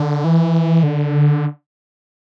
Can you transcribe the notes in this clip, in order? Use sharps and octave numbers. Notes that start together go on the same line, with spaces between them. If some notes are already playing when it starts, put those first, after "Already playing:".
Already playing: D3
E3
D3